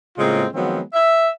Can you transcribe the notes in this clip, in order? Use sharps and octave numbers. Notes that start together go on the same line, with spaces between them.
A2 C#3 G#3 A#3 C4 F4
D#3 F3 F#3 G#3 B3 C4
E5